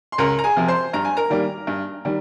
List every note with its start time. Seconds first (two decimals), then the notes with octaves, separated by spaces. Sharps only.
0.12 C6
0.18 C#2 A#4 A#5
0.39 A#5
0.44 G#4 G#5
0.57 C3 F3
0.68 C5 C6
0.93 G2 A#5
1.05 G#5
1.17 A#4 A#5
1.30 D#3 G3 A#3
1.67 G2
2.05 D#3 G3